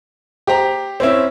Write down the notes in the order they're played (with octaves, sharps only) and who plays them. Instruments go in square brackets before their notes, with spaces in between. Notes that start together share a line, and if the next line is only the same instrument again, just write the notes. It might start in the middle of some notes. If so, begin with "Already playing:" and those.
[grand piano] G4 C5 A#5
[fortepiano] C4 C#4 E4